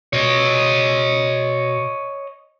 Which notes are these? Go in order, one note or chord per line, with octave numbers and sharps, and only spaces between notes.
B2 C#5 D#5